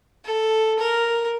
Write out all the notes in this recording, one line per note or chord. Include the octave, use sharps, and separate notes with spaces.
A4
A#4